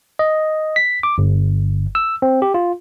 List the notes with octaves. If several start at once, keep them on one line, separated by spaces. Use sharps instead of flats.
D#5
B6
D6
G1
E6
C4
G4
F4